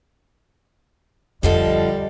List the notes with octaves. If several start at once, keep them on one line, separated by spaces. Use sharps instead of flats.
F2 D3 F3 G3 A4 D#5